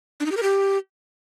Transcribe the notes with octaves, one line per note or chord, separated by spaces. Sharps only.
D4
D#4
G4
A#4
G4